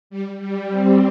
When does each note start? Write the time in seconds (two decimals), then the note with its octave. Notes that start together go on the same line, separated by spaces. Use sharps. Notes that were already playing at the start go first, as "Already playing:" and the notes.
0.10 G3
0.40 G3
0.70 C4